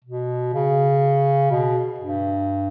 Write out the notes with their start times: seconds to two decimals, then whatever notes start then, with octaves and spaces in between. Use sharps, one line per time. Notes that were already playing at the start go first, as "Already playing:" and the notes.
0.05 B2
0.54 C#3
1.51 B2
2.00 G2